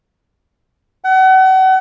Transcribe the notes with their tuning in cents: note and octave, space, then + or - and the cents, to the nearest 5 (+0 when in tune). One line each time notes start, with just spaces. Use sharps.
F#5 +35